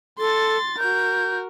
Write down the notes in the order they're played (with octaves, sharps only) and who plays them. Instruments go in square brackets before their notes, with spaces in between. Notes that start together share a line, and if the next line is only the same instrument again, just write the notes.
[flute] A4 [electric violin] C6 A6
[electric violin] F#4 A#4 [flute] G6